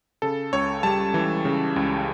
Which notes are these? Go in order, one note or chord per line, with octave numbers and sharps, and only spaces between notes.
C#3 A4
C#2 C#5
G3 A5
E3
C#3
C#2